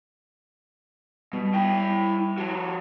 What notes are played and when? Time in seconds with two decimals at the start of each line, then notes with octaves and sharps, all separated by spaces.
1.33 B2 G3
1.54 E4 G5
2.38 F3 F#4